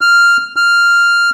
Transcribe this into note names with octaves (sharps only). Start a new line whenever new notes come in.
F6
F6